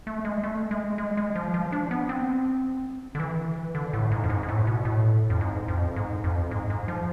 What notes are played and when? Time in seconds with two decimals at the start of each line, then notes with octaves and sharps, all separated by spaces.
0.07 A3
0.25 G#3
0.43 A3
0.71 G#3
0.98 G#3
1.17 G#3
1.35 F3
1.54 F3
1.72 D4
1.91 B3
2.09 C4
3.15 D3
3.20 E3
3.75 D3
3.93 A2
4.11 G#2
4.23 F2
4.30 G#2
4.43 G#2
4.49 A2
4.67 B2
4.85 A2
5.30 F2
5.41 G#2
5.68 F2
5.96 G#2
6.24 F2
6.51 G#2
6.70 G#2
6.88 F3